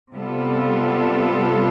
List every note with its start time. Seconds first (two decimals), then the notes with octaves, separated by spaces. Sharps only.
0.14 C3 G3 B3 F4 A4